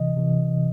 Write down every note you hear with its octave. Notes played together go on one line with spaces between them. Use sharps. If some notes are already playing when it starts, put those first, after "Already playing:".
Already playing: C3 E3 D#5
C3 E3